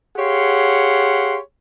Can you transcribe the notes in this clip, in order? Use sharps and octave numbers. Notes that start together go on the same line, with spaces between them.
G4 G#4 C#5 F5 F#5 C6